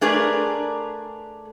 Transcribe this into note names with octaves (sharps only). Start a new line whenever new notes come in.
A3 D4 G#4 A#4 B4 D5